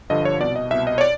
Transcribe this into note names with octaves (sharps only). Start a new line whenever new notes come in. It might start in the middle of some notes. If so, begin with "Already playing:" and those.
G2 D3 F3 D#5
C#5
C2 B2 D5
D#5
C2 B2 E5
D#5
C#5
D5